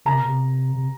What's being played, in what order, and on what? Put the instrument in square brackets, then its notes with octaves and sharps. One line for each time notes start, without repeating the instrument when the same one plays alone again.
[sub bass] C#3 [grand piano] A#5
[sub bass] C3
B2
C3
C3